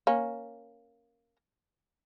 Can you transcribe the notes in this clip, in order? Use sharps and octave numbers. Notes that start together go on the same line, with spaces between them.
A#3 C#4